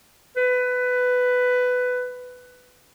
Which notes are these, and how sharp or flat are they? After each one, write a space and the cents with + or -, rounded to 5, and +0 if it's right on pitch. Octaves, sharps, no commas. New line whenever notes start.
B4 +15